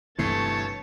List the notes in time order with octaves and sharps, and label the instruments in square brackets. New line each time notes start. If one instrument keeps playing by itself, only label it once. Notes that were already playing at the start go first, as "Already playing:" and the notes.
[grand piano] G1 A3 C7 [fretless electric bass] C3 E3 [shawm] C#5 [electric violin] A5